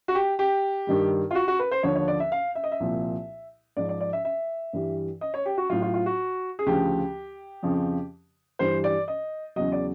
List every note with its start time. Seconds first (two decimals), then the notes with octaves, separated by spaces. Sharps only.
0.08 F#4
0.15 G4
0.39 G4
0.87 G2 D#3 G3
1.31 F4
1.35 F#4
1.48 F#4
1.59 B4
1.71 C5
1.83 D#2 D3 F3 C#5
1.96 C#5
2.08 D5
2.20 E5
2.32 F5
2.55 E5
2.64 D#5
2.72 E5
2.80 C2 A#2 F3
3.77 G#2 F3 D5
3.89 D5
4.00 D5
4.13 E5
4.25 E5
4.73 G2 E3 G3
5.21 D#5
5.34 C#5
5.46 G4
5.58 F#4
5.70 A2 F#3 F4
5.82 F4
5.94 F4
6.06 F#4
6.59 G#4
6.66 D2 C#3 F3 G4
7.63 F2 C#3 F3
8.59 G2 E3 G3 C5
8.84 D5
9.08 D#5
9.56 E2 C#3 F#3 D#5
9.72 D5